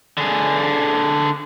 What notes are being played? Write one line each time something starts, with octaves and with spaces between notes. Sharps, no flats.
D3 G#4